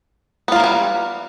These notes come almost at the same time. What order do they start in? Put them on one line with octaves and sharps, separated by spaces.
B3 F4 A#3 E3 G3